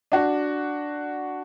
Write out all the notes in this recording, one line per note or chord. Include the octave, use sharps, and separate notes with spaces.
D4 F#4